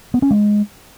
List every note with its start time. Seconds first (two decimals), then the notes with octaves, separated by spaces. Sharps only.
0.14 B3
0.22 C#4
0.31 G#3